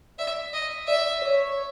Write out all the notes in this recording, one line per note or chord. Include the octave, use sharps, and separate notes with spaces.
D5 E5
D#5
D5 E5
C#5